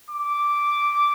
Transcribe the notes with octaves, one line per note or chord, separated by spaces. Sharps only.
D6